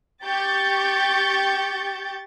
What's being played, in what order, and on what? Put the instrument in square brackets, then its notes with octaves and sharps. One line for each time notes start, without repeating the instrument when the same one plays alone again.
[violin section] G4 C#6 G6 A6